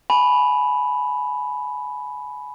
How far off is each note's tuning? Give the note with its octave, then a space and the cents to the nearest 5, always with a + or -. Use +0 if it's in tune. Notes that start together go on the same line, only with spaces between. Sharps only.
G#5 +25 B5 +0